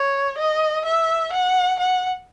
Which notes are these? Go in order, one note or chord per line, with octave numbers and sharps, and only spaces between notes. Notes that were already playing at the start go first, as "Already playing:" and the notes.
Already playing: C#5
D#5
E5
F#5
F#5